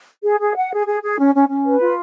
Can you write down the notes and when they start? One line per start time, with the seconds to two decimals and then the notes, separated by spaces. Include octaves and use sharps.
0.23 G#4
0.40 G#4
0.55 F#5
0.72 G#4
0.87 G#4
1.03 G#4
1.18 C#4
1.34 C#4
1.49 C#4
1.66 B4
1.81 F4